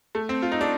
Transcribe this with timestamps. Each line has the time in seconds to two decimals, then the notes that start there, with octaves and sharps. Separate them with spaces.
0.15 A3
0.29 C4
0.42 F4
0.52 D#4
0.61 D4